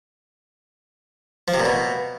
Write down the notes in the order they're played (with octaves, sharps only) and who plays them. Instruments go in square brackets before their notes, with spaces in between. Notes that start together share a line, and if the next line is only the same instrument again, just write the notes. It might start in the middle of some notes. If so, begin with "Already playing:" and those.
[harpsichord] F3
C3
A#2
B2